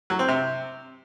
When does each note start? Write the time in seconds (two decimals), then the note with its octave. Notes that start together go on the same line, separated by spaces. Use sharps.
0.10 F#3
0.19 C4
0.28 C3